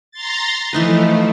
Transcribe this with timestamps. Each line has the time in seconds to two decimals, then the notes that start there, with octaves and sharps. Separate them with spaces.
0.11 A#5 C6 A6
0.73 E3 F3 A3 D#4 B4